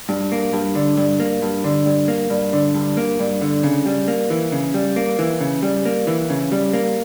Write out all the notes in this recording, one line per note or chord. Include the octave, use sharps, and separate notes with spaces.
G2
A#3
G2
D3
G2
A#3
G2
D3
G2
A#3
G2
D3
G2
A#3
G2
D3
C#3
G3
A#3
E3
C#3
G3
A#3
E3
C#3
G3
A#3
E3
C#3
G3
A#3